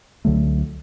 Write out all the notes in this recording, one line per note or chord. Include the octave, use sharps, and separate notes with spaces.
C#2 D3 F#3 A3